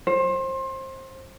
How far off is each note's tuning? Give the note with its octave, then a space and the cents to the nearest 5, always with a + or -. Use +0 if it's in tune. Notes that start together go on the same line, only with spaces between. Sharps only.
C5 +25